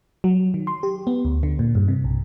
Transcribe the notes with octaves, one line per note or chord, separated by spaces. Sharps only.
F#3
D#3
C6
G4
B3
D2
D3
A#2
G2
C3
B1